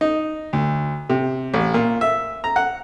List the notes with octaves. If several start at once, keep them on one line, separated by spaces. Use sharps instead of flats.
D#4
D2
C3
A1
A#2
E5
A#5
F#5